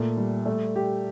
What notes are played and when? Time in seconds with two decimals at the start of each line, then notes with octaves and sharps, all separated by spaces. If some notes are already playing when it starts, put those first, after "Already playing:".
Already playing: A#2 A3
0.17 G3
0.46 A3
0.76 G4